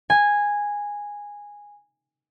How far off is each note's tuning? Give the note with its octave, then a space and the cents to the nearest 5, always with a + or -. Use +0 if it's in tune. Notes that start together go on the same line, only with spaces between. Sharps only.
G#5 -10